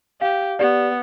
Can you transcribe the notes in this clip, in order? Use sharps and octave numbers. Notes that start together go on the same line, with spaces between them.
G4 F5
B3 G4 D5